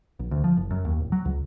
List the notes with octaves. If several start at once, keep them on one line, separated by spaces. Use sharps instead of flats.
A#1
D2
F3
F#1
F#2
D#2
D1
F#3
C#2